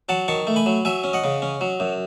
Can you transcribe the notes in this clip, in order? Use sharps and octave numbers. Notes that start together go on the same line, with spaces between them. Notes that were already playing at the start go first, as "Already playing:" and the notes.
F#3 F#5 A5
D#3 A5 C#6
A3
G#5 B5
F#3
F#3 E5 G#5
C#4
D#5 F#5
C#3
C#4
F#3
F#2